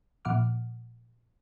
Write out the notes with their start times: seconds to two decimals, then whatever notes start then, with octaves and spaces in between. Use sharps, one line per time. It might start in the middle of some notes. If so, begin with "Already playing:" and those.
0.25 A#2 F3 F#5 D6 F6